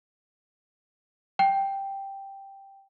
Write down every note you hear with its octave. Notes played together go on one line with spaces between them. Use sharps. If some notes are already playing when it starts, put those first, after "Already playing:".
G5